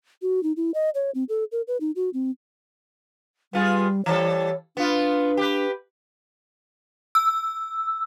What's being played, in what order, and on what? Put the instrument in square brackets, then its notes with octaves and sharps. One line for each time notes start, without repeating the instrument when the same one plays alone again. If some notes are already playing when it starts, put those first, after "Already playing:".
[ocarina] F#4
D#4
E4
D#5
C#5
C4
A4
A#4
B4
D#4
F#4
C4
[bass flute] G3 [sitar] B3 F4 G#4
[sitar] E3 G3 A4 [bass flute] C#5
[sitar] B3 F4 [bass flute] D4
[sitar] G4 B4
[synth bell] E6